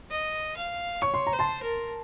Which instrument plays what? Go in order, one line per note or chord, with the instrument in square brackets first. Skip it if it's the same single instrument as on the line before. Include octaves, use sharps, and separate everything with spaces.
[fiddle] D#5
F5
[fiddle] C#5 [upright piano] C#6
[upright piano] C6
A#5
[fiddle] C5
[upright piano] A5 C6
[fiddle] A#4